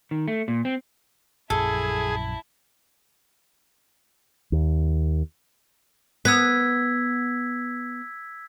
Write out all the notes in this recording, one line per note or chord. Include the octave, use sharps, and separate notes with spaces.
D#3
A3
A#2
C4
A#1 F#2 F#3 E4 G#4 A4 A5
D#2
B3 E6 G#6 B6